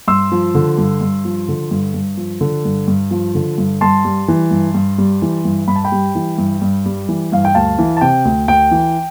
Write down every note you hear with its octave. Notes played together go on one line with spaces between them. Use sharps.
G2 C6 E6
F3
D3
G2
G2
F3
D3
G2
G2
F3
D3
G2
G2
F3
D3
G2
G2 A5 C6
G3
E3
G2
G2
G3
E3
G2
G2 B5
A5
G5 B5
G3
E3
G2
G2
G3
E3
G2 F5
G5
D2 F5 A5
E3
A5
C3 G5
D2
D2 G5
E3